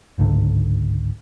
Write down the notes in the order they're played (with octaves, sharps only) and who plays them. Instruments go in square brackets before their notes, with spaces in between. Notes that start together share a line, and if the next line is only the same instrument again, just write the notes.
[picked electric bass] G1 C#2 G#2 D3